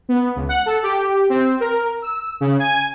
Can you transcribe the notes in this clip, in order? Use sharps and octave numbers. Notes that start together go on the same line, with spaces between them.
B3
C#2
F#5
A4
G4
C4
A#4
E6
C#3
G#5